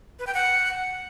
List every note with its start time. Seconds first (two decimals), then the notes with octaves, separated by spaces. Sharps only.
0.19 B4
0.27 G5
0.34 F#5